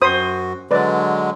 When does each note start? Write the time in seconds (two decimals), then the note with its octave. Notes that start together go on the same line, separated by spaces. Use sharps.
0.02 F#2 F#4 C5 B5 D#6
0.71 D3 F#3 G#3 B4 D5